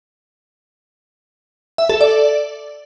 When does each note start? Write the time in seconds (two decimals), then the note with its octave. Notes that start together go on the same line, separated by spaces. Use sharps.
1.78 E5
1.89 A4
2.01 D5